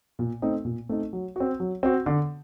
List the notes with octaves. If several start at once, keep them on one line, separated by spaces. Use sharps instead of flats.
A#2
A3 C4 D#4
A#2
A3 C4 D#4
F#3
C4 F#4
F#3
C4 F#4
D3